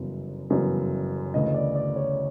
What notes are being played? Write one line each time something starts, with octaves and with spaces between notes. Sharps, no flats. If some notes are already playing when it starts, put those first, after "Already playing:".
Already playing: G1 F#2 C#3 E3
G1 F#2 C#3 E3
D2 C#3 E3 D#5
D#5
D5
D5
C#5